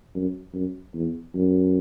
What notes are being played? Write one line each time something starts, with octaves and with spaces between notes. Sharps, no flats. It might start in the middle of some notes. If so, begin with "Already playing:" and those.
F#2
F#2
E2
F#2